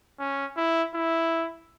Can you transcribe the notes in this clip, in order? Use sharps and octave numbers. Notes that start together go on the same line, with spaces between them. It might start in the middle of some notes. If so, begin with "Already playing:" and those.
C#4
E4
E4